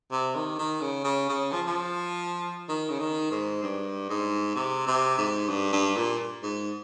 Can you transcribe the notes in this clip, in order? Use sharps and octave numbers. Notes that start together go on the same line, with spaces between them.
C3
D#3
D#3
C#3
C#3
C#3
F3
F3
D#3
C#3
D#3
G#2
G2
G#2
C3
C3
G#2
G2
G2
A#2
G#2